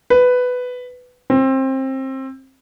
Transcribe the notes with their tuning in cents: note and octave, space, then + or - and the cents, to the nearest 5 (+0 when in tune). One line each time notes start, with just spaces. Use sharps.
B4 +10
C4 +25